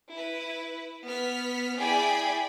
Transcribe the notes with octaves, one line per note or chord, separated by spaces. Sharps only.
E4 B4
B3 F6 B6
E4 G#4 D5 G5 B5